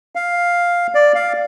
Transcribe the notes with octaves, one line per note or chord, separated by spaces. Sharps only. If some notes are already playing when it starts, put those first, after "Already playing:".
F5
D5
F5